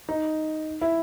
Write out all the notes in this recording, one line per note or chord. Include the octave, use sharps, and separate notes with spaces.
D#4
E4